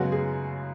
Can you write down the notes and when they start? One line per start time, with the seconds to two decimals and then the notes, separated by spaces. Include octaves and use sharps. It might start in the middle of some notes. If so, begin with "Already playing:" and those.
Already playing: F#2 C#3 G#3 B3 F#4
0.12 G#4